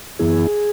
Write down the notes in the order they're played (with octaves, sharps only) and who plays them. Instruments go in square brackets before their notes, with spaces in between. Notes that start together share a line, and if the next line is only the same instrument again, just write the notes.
[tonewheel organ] F#2 E3 B3 E4 G#4